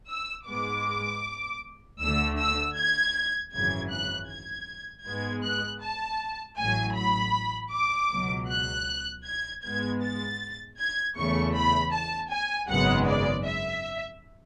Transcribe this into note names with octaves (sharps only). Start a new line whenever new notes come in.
E6
G#2 G#3 B3 D6
D2 D3 A3 E6
E6
G#6
G#1 F#2 C#3 E3 G#6
F#6
G#6
G#2 G#3 B3 G#6
F#6
A5
A1 A2 F#3 G#5
B5
D6
C#2 B2 F#3
F#6
G#6
G#2 G#3 B3 G#6
A6
G#6
E2 C#3 E3 A3 C#6
B5
A5
G#5
G#1 F#2 C#3 G#3 B3 F#5
D5
E5